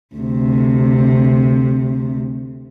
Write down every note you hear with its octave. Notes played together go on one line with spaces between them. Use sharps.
D2 C3